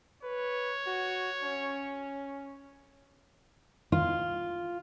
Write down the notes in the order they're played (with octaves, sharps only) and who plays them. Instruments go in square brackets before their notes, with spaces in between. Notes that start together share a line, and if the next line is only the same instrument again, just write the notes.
[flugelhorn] B4 [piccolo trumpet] C#5
[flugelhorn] F#4
C#4
[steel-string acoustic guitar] F4